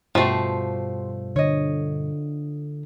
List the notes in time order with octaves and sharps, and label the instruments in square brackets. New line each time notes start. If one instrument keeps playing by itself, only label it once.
[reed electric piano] G2 B2 G3 [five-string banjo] F3 A3 [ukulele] F#4 G4 C5
[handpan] D3 [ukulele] C#5 D#5